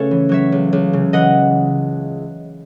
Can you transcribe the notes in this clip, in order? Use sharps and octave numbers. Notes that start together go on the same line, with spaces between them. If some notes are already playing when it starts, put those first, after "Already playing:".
Already playing: C#3 A3 C#4 A4 B4 C#5
E3
F#3 C#5 E5
C#2
C#2
C#3
E3 D#5 F#5